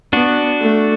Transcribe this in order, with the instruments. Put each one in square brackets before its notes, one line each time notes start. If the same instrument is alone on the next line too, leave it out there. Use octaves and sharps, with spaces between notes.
[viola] B3 [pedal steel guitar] D4 F#4
[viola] A3